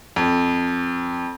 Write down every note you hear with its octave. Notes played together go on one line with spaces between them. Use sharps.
F2